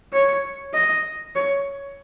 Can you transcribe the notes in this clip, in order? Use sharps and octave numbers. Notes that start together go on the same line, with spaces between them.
C#5
D#5
C#5